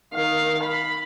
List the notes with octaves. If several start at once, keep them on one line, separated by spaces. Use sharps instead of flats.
D#3 F5
B5